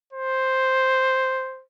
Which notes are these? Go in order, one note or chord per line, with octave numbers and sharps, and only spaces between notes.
C5